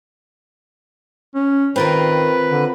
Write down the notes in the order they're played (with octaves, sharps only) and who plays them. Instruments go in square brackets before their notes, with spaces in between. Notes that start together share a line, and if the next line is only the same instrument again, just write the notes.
[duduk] C#4
[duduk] D#3 [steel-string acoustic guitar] C4 F4 A#4 [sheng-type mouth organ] B4
[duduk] D3